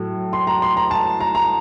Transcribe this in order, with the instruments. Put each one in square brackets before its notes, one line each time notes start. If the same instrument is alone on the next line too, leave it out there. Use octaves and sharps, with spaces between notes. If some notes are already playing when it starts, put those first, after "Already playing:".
Already playing: [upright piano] A2 F#3 A3
C6
A#5
C6
A#5
A5
A#5
A#5